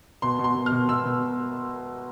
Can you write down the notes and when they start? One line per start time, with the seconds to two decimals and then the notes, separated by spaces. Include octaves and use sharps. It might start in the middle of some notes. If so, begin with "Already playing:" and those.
0.22 B2 C6
0.39 B2
0.44 C6
0.55 B2
0.66 F6
0.72 B2
0.88 B2 E6
1.06 B2